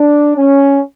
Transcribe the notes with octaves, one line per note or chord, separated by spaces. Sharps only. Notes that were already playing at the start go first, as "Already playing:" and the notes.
Already playing: D4
C#4